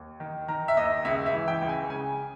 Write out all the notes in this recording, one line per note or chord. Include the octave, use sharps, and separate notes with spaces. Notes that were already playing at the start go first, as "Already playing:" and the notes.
Already playing: D#2
D#3
D#3 A#5
E5
D#2 D#5
C#2 E5
E5
E3
G5
C#2
G#5
C#3 G#5